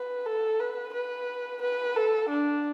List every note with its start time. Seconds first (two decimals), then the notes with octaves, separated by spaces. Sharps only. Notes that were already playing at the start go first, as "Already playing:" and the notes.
Already playing: B4
0.26 A4
0.60 B4
0.94 B4
1.62 B4
1.96 A4
2.29 D4